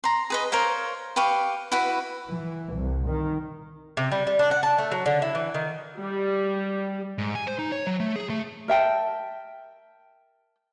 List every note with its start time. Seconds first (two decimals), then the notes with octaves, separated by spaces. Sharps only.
0.04 A#5 C6
0.30 G#4 B4 D#5
0.52 A#4 C5 C#5 F5
1.16 G4 B4 F5 C#6
1.72 E4 F#4 B4
2.30 E3
2.75 C2
3.08 D#3
3.97 C3
4.12 G3
4.27 G3
4.39 D4
4.51 F#5
4.63 A5
4.78 A3
4.92 F#3
5.06 D3
5.22 E4
5.35 E3
5.54 D#3
5.98 G3
7.18 G#2
7.35 G#5
7.47 C5
7.59 D#4
7.72 C#5
7.87 F#3
8.00 A3
8.16 G#4
8.30 A3
8.68 A#4 E5 G5 A5